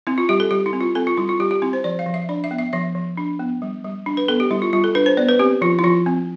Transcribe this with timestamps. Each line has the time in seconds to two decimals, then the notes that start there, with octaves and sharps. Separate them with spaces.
0.07 C4 E4
0.18 F4
0.29 G3 G4
0.40 A4
0.51 G3 G4
0.66 E4
0.73 C4
0.81 F4
0.95 C4 A4
1.07 F4
1.17 G3 E4
1.29 F4
1.40 G3 G4
1.51 G4
1.62 C4 E4
1.73 C5
1.84 F3 D5
1.99 F5
2.06 F3
2.14 E5
2.29 D4 D5
2.44 E5
2.51 B3
2.58 E5
2.73 F3 E5
2.95 F3
3.17 D4
3.39 B3
3.62 G3
3.84 G3
4.06 D4
4.17 B4
4.28 B3 A4
4.40 G4
4.51 G3 E4
4.62 F4
4.73 G3 F4
4.84 A4
4.95 D4 B4
5.06 C5
5.17 B3 D5
5.29 B4
5.39 C4 G4
5.61 F3 F4
5.79 E4
5.84 F3 F4
6.06 C4